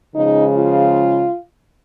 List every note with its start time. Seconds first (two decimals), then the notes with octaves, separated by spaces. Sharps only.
0.15 C#3 F3 G#3 D#4
0.54 F4